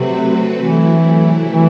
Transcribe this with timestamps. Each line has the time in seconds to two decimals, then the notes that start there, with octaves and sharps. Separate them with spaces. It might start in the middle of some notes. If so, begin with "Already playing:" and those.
Already playing: C3 F#3 A3 C4 F#4 B4
0.58 C3 E3 F#3 A3 E4
1.51 E3